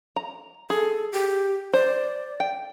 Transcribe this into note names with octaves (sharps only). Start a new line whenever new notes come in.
A#5
G#4 A4
G4
C5 D5
G5